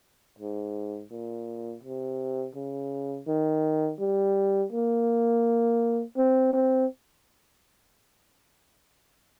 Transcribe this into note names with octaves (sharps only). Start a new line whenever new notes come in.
G#2
A#2
C3
C#3
D#3
G3
A#3
C4
C4